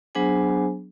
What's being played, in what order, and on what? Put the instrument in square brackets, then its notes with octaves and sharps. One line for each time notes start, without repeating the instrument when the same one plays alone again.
[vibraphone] F#3 B3 D4 G#4 C5 G#5